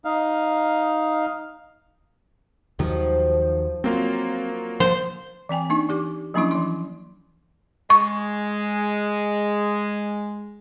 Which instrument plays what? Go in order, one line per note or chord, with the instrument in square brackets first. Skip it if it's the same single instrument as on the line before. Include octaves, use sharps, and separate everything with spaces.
[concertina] D#4 F5
[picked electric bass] D#2 D#3 F#3 [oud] F3
[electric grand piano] F#3 A#3 F4 [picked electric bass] C4
[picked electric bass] F3 [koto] C5
[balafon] E3 C4 G5 G#5
A#3 D4 D#4 C#6
E3 G4 D6
F3 F#3 A#3 C#4 D4 E4
E3 C6
[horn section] G#3 [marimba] C#6